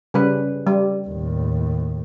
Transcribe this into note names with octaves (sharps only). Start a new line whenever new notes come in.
C#3 G3 B4
G3
D#2 A2